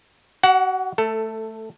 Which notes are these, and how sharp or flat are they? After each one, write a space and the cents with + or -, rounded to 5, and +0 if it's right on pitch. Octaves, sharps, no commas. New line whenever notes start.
F#4 +35 F#5 +0
A3 +0 A4 +15